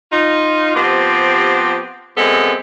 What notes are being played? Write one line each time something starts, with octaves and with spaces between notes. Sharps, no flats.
D#4 F4
F3 B3 C4 G4
F#2 G#3 B3 C4 A4